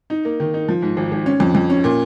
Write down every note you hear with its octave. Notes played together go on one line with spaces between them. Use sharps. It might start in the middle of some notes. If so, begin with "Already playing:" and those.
D#4
A#3
D#3
D#4
F3
G#2
G#1
G#1
C#4
F2
F2
C#4
A#2